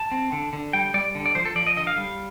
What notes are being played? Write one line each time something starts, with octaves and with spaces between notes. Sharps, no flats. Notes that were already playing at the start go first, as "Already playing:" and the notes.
Already playing: A5
C4
D3
D3
G3 G5
G3 D5
D3
D5
F3 C5
A4
F3 D5
D#5
D3 D#5
F5
G3